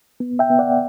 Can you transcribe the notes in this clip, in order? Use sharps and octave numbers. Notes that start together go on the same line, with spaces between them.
B3
E5 G5
B3
D5 F#5